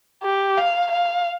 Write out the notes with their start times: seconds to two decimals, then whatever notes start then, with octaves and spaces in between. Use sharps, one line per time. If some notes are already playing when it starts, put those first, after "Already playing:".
0.23 G4
0.57 F5
0.91 F5